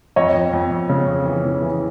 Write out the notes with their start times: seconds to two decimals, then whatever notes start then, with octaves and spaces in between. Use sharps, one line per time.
0.16 F2 C#5 D#5
0.34 F2
0.53 F2
0.71 F2
0.89 C#3
1.07 F2
1.26 E3
1.45 C#3
1.62 E3